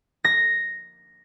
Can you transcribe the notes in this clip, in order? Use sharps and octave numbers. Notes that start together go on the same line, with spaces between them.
A#6